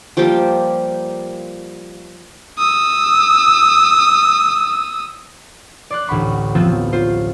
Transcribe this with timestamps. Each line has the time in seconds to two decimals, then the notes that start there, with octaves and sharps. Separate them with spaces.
0.17 F3 G3 A#3 G4
2.59 D#6 E6
5.90 D5 C6 F#6
6.08 A1 D2 F#5 B5 C#6
6.55 F3 F#3 B3 C4 F4 A4
6.93 F4 C5